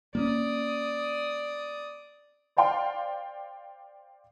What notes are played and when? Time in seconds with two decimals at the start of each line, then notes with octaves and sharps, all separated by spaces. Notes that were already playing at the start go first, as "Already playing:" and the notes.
0.15 A#3 B3 C#4 D5 D#6
2.57 C5 D5 F5 G5 C6